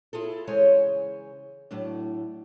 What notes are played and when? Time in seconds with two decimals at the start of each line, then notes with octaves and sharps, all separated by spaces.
0.13 E4 F4 G#4 A4
0.47 C#3 E3 G#3 C5 C#5 G#5
1.71 A2 F#3 D4